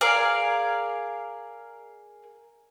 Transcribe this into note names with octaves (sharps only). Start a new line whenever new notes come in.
G#4 A#4 D5 F5